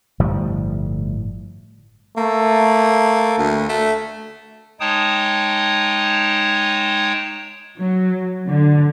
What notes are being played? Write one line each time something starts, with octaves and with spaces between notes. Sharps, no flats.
G1 A2 F3 G3
A3 A#3
D2
A3
G#3 D#4 C#5 G5 A5 D#6
F#3
D3